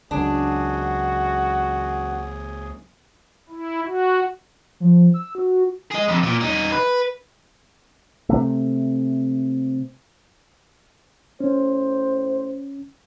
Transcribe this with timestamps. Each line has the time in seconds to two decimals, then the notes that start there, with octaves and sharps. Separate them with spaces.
0.11 C#2 F#2 D4 F#4 G#4
3.50 E4
3.86 F#4
4.80 F3
5.14 E6
5.35 F#4
5.92 G#4 D#5
6.08 F2 C3
6.23 A#2
6.41 G3 D#4
6.72 B4
8.29 C3 A3
11.40 A2 C#4 C5